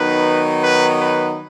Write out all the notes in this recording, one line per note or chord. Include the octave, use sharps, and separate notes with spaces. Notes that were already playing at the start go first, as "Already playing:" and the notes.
Already playing: D#3 F#3 B3 D#4 B4
B4
B4